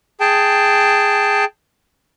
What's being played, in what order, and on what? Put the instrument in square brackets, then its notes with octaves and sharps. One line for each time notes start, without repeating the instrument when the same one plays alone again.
[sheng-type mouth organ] G#4 G5 A5